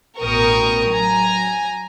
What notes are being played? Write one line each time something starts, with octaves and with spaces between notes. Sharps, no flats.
A1 B2 A#4 G5 C#6 D#6
F#3 G#5 A#5